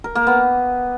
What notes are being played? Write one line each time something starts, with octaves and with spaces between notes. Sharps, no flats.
A#4
A#3
B3